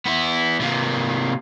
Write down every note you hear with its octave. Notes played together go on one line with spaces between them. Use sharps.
B3 E4
C3 A#3